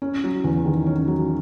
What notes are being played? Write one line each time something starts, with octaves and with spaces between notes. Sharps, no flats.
C#4
F#3
E2
D#3
C#4
F#3